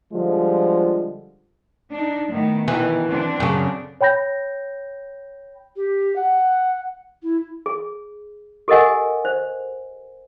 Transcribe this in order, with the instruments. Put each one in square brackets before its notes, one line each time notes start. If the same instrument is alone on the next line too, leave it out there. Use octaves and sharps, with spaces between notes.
[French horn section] D3 F3 G3 G#3 F4
[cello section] D4 D#4
A2 D#3 B3
[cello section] B2 D#3 [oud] E3
[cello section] D3 C4 D4
[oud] F#2 C#3
[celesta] C#5 G5 B5 G6 A#6
[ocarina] G4
F#5
E4
[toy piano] G#4
G4 A4 A#4 D#5 F#5 G#5
C5